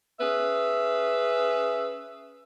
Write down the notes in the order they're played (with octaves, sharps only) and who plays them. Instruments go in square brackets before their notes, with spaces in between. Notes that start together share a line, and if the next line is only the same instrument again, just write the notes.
[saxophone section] C#4 G#4 B4 E5